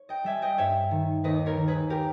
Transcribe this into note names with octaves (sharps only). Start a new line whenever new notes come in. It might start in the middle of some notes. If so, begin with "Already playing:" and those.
Already playing: C#5
D#5 G5
G3 E5 G#5
D#5 G5
G2 C#5 E5
D#3
D#2 B4 D#5
A#4 C#5
D#3
G#4 B4
G4 A#4